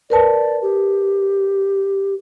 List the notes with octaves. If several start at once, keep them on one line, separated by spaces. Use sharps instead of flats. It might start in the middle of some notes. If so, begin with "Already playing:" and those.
A#4 B4 D5 A5
G4